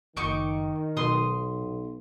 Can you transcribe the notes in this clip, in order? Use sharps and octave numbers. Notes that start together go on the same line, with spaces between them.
F#1 D#3 D#4 C#6 D6
B1 B2 C6 D#6